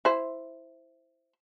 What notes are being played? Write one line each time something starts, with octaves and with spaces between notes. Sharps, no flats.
E4 C5